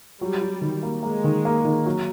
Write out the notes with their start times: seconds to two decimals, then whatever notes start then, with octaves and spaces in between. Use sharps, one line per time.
0.21 F#3 G3
0.42 F#3
0.61 D#3
0.83 A#3
1.03 G#3 A#3
1.24 D#3
1.45 A#3
1.65 D#3
1.86 F#3